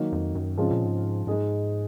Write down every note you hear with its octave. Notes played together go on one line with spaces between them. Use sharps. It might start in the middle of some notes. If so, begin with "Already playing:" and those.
Already playing: D#3 F#3 A#3 D#4
F2
F#2
G#2 C#3 F3 G#3 C4 F4
A#2
G#2
G#2 G#3 D#4 G#4 D#5